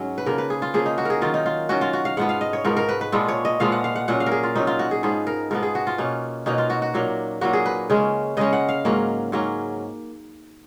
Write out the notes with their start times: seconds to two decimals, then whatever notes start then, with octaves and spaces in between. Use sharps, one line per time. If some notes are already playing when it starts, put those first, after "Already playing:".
Already playing: G#2 F#3 C#4
0.18 B4
0.26 C#3 F3 A#3 A#4
0.38 B4
0.50 G#4
0.62 F4
0.74 C#3 F3 A#3 G#4
0.86 D#4
0.98 F#4
1.05 G#4 A#4
1.21 D#3 F#3 C#4 F4
1.34 D#4
1.46 F4
1.69 D#3 F#3 C#4 F#4
1.81 F4
1.93 F#4
2.05 F5
2.17 G#2 F3 B3 F#5
2.29 F5
2.41 D#5
2.53 C#5
2.65 G#2 F3 B3 A#4
2.77 A#4
2.89 B4
3.01 B4
3.12 A#2 F3 G#3 B3
3.28 C#5
3.45 D#5
3.60 A#2 F3 G#3 B3 F5
3.72 F#5
3.84 F5
3.96 F#5
4.08 A#2 F#3 C#4 F#5
4.20 F5
4.26 A#4
4.32 G#4
4.43 F4
4.56 A#2 F#3 C#4 D#4
4.67 F4
4.79 F#4
4.91 G#4
5.03 G#2 F3 B3 G#4
5.27 A#4
5.51 G#2 F3 B3 A#4
5.63 G#4
5.75 F#4
5.87 F4
5.98 B2 A#3 C#4
6.46 B2 A#3 C#4 D#4
6.58 F4
6.70 F#4
6.82 F#4
6.94 A#2 F#3 A#3
7.41 A#2 F#3 A#3 F#4
7.53 G#4
7.66 B4
7.90 C#3 G#3 C#4
8.37 C#3 G#3 C#4 D#5
8.53 F#5
8.69 F5
8.85 G#2 F#3 A#3 C#4
9.32 G#2 F#3 A#3 C#4